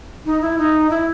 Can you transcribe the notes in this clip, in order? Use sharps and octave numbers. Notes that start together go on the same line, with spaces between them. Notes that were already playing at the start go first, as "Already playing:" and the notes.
D#4
E4
D#4
E4